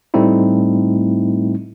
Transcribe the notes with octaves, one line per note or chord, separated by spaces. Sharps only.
A2 G3 A3 C4 D#4 E4